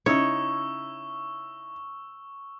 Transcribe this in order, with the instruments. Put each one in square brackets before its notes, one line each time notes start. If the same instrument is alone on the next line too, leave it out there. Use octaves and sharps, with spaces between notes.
[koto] C#3 C#4 [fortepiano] D#4 E4 [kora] C#5 [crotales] C#6 E6